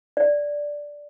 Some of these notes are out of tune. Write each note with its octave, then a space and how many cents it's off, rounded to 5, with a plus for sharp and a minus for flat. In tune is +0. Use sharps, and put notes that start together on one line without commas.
D5 -5